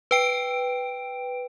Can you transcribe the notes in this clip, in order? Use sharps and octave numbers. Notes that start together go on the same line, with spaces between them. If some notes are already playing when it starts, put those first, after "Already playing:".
B4 G5 D7